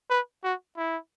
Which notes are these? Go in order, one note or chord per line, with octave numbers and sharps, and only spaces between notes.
B4
F#4
E4